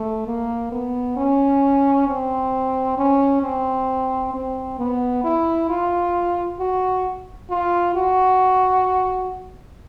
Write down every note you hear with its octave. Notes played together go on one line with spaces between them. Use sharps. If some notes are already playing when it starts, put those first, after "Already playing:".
Already playing: A3
A#3
B3
C#4
C4
C#4
C4
C4
B3
E4
F4
F#4
F4
F#4